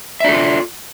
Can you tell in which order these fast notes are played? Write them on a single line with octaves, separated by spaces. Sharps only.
E5 D4 A4 F4